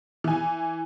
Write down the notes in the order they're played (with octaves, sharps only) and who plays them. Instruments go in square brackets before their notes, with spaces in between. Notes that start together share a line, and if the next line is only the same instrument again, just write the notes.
[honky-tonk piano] E3 G#5